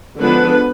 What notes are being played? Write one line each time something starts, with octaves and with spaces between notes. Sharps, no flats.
D3 F3 G#3 B3 D4 B4